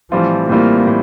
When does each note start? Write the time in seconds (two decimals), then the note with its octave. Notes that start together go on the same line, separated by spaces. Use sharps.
0.11 A2 E3 F3 G3 C4 F4
0.49 A2 E3 G3 A#3 C4 F4
0.87 A2